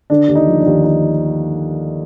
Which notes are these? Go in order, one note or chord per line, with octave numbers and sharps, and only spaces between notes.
D3 D4
D#2
D#4
F3
D4
D#2
D#4